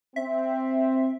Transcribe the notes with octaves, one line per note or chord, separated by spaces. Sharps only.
C4 E5